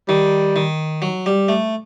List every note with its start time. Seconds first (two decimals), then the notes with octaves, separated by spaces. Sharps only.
0.08 D#3 G3
0.56 D#3
1.02 F#3
1.26 G3
1.49 A3